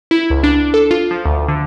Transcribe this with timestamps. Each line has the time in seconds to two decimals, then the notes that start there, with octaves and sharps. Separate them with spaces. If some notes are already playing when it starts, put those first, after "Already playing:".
0.11 E4
0.30 C#2
0.43 D4
0.74 A4
0.91 F4
1.11 F3
1.26 D2
1.48 D3